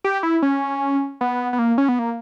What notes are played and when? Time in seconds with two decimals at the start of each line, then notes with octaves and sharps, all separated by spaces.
0.04 G4
0.23 E4
0.42 C#4
1.21 B3
1.53 B3
1.59 A#3
1.78 C#4
1.89 B3
1.99 A#3